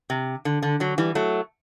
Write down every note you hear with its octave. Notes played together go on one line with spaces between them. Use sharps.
C3
D3
D3
D3 F#3
E3 G3
F#3 A3